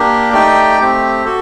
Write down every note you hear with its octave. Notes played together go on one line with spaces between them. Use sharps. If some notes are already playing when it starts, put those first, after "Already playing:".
Already playing: A#3 D4 G4 A#4
A3 D#4 G4 D5 G5
A3 C4 G4
F#4 A4